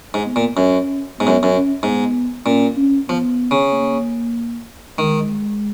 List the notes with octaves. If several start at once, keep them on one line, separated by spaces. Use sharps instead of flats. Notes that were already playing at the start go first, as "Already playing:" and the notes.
G#2
B3
A#2
F#2 C#4
G#2 B3
F#2
F#2
C#4
G#2 B3
A#2 C#4
C#4
F3 B3
C#3
A#3
D#3 G#3